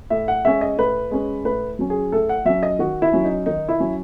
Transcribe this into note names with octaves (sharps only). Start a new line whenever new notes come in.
A2 E5
F#5
G#3 C#4 E5
D#5
A2 B4
G#3 C#4
A2 B4
F#3 C#4
G#4
A2 A4
F#5
F#3 C#4 E5
D#5
D#3 F#4
E4
F#3 C#4
D#4
D#3 D#4
E4
F#3 C#4